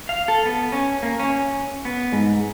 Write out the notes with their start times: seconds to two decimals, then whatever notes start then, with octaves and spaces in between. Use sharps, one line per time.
0.09 F5
0.28 A4
0.45 B3
0.72 C#4
1.03 A#3
1.19 C#4
1.85 B3
2.13 G#2